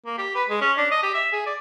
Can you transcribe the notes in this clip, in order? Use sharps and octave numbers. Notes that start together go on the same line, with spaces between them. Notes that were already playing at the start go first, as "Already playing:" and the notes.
A#3
G4
B4
G#3
C#4
D4
D#5
G4
E5
G#4
D5